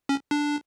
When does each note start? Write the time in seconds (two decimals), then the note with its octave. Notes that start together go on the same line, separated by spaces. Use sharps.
0.09 C#4
0.31 D4